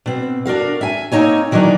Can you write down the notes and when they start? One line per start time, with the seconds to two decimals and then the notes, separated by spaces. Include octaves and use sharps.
0.06 B2 C4
0.46 D4 F#4 A#4 F5
0.81 E5 G#5
1.12 A#3 C4 D#4 C#5 G#5
1.51 B2 D#3 E3 F#3 A#3 D4